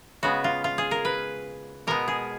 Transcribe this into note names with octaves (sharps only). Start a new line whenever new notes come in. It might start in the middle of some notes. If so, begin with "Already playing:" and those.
C#3 G#3 B3 F#4
F4
F4
G#4
A#4
B4
B2 G#3 B3 A#4
G#4